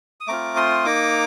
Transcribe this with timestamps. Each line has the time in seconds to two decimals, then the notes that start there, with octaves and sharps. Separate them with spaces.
0.20 D#6
0.28 A3 C4 F4 A#5 D6
0.56 C6 D#6
0.85 A#3 D#4 A#5 D6